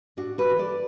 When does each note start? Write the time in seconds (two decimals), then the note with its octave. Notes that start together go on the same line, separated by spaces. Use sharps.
0.17 A2 D4 F#4
0.38 F#4 B4
0.49 E3
0.59 A4 D5